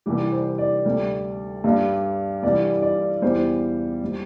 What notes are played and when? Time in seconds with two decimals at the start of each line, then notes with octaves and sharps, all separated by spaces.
0.06 C2 C3 E3 G3 G4
0.32 C5
0.58 D5
0.85 D2 C3 G3
1.64 G2 G3
2.43 C2 C3 E3 G3 D5
2.82 D5
3.22 E2 E3 G3 C5
4.04 G3